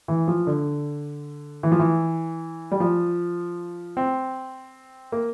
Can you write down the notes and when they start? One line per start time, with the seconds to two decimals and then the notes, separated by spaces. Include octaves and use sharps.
0.08 E3
0.28 F3
0.47 D3
1.63 E3
1.72 F3
1.79 E3
2.71 G3
2.80 F3
3.97 C4
5.12 A#3